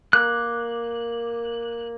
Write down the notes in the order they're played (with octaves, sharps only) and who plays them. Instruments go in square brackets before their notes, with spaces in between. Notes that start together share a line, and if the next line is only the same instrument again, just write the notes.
[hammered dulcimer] A#3 [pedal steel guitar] F#6